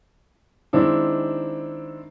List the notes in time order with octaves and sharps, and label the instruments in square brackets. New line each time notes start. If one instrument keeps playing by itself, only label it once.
[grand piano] D#3 G#3 C4 D4 E4